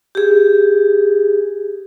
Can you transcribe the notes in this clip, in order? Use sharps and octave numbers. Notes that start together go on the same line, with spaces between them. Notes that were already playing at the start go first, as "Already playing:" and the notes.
G4 G#4